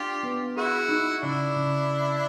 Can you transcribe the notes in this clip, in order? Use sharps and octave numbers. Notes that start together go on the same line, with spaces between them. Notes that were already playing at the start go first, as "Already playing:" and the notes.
Already playing: D4 F4 G4
B3
E4 F#4 G#4
D#4
C#3 D4 E4
C#3